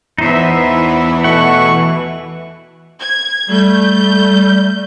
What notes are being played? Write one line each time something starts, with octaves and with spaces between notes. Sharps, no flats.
E2 E3 B3 D#4 C5 E5
B2 A3 F#5 C#6
G#6
G3 A3 G6